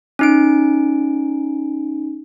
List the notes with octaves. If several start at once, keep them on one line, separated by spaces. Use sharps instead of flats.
C#4 D#4 D7